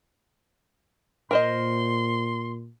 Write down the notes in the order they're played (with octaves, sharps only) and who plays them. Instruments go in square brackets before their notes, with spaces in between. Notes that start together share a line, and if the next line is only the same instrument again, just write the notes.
[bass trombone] A#2 [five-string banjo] A#4 C5 D#5 [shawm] C6